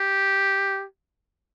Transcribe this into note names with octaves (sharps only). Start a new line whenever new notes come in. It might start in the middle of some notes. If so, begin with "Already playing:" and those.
Already playing: G4